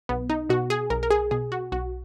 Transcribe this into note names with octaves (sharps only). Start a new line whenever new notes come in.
B1 B3
D#4
B2 F#4
G#4
B1 A#4
A#4
G#4
B2 G#4
F#4
B1 F#4